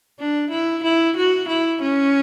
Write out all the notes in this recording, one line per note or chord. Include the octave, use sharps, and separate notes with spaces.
D4
E4
E4
F#4
E4
C#4